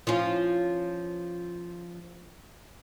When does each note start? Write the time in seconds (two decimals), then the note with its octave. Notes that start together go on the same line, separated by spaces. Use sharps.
0.07 F3 C#4 F4